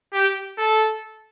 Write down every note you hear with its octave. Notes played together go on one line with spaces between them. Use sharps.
G4
A4